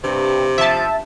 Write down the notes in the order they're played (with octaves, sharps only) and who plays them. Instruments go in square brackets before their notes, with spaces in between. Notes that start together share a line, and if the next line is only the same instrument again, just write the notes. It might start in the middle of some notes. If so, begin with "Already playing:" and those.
[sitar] G2 [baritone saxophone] C3
[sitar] F3 [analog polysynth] E5 A5